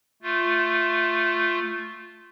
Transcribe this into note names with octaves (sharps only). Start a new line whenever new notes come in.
A3 F4